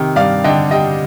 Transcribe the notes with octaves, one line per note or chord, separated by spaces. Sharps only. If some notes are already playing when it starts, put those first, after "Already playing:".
Already playing: C3 D#3
G2 D5 F5
D3 D#5 G5
G3 D#5 G5